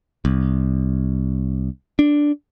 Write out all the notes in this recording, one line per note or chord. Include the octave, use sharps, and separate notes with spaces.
C2
D4